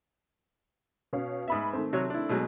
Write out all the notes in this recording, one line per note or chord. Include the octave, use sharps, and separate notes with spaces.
B2 C#4 F5
G#2 B3 E5 B5 D#6
D#3 A3 C4
C3 F#3 C#5
D4 E4
B2 F#3 G#3